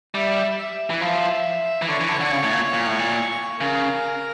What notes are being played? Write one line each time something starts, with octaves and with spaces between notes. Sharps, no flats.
G3 E5
E5
E3
F3 E5
E3
D3 C#5
E3
D3
D3
C#3
A2
A#2
A#2
A2
A#2
C#3 A#4